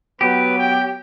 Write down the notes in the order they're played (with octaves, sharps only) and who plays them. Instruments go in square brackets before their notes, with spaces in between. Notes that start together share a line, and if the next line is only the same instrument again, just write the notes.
[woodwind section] F#3 B3 [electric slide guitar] G4 [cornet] B4
[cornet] G5